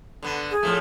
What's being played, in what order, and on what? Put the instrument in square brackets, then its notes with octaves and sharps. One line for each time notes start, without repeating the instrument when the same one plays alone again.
[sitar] D3 B3
[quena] G#4
[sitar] A2 F3 A3